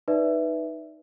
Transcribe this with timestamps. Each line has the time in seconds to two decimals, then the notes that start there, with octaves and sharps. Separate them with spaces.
0.08 D#4 B4 D5 E5